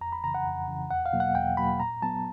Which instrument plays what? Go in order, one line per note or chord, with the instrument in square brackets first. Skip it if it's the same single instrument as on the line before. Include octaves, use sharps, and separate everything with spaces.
[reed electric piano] F2 A#5
B5
C#3 E3 A#5
F#5
F2
C#3 E3
E2 F#5
F5
B2 F#3 A#3
F#5
E2 G5
B2 F#3 A#3 B5
A#2 A#5
F#3 B3 A5